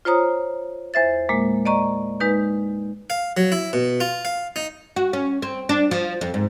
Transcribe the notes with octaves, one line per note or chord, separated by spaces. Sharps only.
F4 C5 C#5 A#5 D#6
E2 C5 E5 A6
A#2 G#3 A#3
D5 D#5 A#5 C#6
G#3 D#4 B4 G6
F5
F#3
E4
B2
F4
F5
D#4
F#4
C#4
C4
D4
F3
F2
G#2